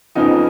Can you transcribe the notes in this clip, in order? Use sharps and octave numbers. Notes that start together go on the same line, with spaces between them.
F2 C#3 F3 B3 D#4